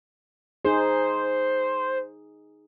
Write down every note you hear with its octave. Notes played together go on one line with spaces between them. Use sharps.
D#4 G#4 C5